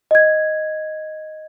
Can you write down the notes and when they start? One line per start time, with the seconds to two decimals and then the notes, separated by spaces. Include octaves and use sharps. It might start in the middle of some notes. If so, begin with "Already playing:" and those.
0.11 D#5 G#6